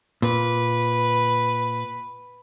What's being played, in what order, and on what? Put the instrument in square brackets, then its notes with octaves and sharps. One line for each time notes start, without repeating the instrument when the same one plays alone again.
[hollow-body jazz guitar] A#2 [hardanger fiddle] B4